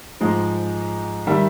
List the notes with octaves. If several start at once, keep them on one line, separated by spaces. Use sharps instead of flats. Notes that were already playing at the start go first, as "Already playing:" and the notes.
G#2 F3 G#3 D#5
D#3 G3 E5